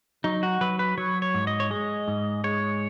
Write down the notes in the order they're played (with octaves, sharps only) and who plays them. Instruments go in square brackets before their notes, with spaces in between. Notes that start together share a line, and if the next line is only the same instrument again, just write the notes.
[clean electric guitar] F#3 [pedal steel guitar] D#4
[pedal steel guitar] F#4
[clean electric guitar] F#3 [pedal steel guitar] B4
[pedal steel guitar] B4
[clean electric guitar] F#3 [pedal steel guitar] C#5
[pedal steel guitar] C#5
[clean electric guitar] G#2
[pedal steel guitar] D#5
C#5
[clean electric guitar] G#3 [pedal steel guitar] D#5
[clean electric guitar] G#2
[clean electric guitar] G#3 [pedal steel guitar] C#5